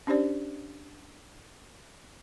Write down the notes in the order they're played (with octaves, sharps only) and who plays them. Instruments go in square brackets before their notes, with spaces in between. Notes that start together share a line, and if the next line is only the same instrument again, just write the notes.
[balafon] C#4 D4 G4 C5 D5